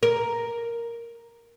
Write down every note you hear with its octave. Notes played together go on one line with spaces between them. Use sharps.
A#4